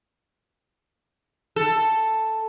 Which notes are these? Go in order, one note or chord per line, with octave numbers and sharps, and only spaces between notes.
A4